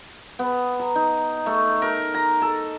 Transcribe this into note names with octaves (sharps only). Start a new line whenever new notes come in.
B3
A#5
D#4
A3
A#4
A#5
A4